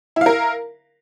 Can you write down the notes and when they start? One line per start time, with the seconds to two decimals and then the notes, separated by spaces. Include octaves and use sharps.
0.16 E4
0.21 F5
0.26 A#4